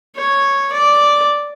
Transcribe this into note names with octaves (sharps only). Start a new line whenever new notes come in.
C#5
D5